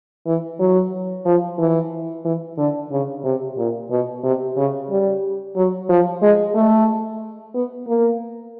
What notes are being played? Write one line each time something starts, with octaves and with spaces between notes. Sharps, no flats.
E3
F#3
F3
E3
E3
D3
C#3
C3
A#2
B2
C3
C#3
G3
F#3
F3
G#3
A3
B3
A#3